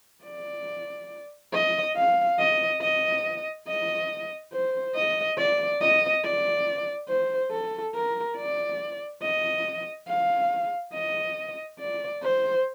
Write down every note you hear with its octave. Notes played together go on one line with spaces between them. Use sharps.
D5
D#5
F5
D#5
D#5
D#5
C5
D#5
D5
D#5
D5
C5
A4
A#4
D5
D#5
F5
D#5
D5
C5